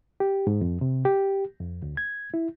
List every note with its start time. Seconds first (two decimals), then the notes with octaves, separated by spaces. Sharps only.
0.20 G4
0.47 G#2
0.61 F2
0.81 C3
1.05 G4
1.60 F2
1.82 D2
1.97 G#6
2.34 E4